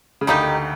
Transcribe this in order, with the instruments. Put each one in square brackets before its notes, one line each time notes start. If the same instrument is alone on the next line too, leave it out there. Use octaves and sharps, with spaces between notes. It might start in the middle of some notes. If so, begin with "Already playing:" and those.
[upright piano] C#3
[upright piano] D2 D3 [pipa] G3 A#3 D#4 G4